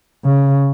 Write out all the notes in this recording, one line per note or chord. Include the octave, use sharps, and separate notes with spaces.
C#3